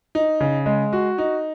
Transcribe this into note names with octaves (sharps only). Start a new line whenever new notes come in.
D#4
C#3
G#3
F#4
D#4